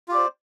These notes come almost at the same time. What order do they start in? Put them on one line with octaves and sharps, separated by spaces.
F4 G4 D5 C5